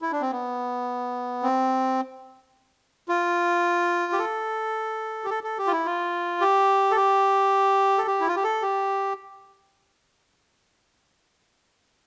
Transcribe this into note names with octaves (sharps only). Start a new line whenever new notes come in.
E4
D4
C4
B3
C4
F4
G4
A4
G4
A4
A4
G4
F4
E4
F4
G4
A4
G4
A4
G4
E4
F4
G4
A4
G4